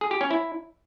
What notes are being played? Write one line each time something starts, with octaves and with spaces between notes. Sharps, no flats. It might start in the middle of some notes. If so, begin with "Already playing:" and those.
G#4
G4
C#4
E4